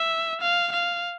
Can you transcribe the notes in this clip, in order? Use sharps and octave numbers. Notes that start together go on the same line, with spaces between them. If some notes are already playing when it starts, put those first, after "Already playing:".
Already playing: E5
F5
F5